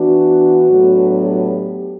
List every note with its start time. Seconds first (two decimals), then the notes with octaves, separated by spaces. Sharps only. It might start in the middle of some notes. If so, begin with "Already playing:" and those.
Already playing: E3 B3 D4 F#4
0.66 A2 F#3 B3 D4
1.20 G4